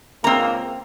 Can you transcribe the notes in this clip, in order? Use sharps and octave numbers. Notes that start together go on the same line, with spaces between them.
C#2 A#3 C4 A#5